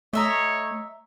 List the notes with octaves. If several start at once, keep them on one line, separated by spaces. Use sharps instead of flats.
A3 C#5 D#5 E5 A#5